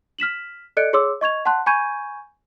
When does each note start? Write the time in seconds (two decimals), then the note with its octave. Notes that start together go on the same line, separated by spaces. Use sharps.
0.19 F6 B6 E7 F#7
0.77 A4 D5 D#5 F#6 C#7 D7
0.93 G#4 C#5 C6 D6 E6
1.21 D#5 C#6 G#6 F7
1.45 F#5 A5 C6 F#6
1.66 G#5 B5 C#6 G6 G#6 D#7